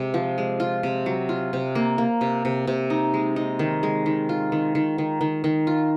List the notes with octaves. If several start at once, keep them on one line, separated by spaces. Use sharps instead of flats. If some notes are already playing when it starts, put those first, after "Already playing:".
Already playing: C3 G#3
F3
G#3
F4
C3
F#3
F4
C3
A#3
A#3
C3
C3
C3
D#4
G#3
D#4
D#3
G#3
D#3
F4
D#3
D#3
D#3
D#3
D#3
F4